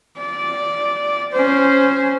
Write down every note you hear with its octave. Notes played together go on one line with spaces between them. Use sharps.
D5
C#4 C5